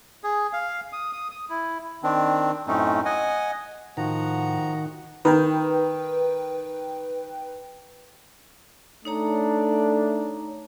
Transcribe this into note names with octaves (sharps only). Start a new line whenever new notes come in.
G#4
F5
D#6
D#6
D#6
E4
D#3 C4 D4
F#2 A2 A3 C4 C#4 D#4
D#5 F#5 G#5
A2 D#3 F3 F#4 F#5 A#5
D#3 B4 G5
A3 D4 D#4 C#5 A#5